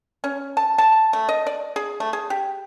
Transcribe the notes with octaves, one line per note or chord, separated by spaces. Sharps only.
C#4
A5
A5
A3
D#5
D5
G#4
A3
G#4
G4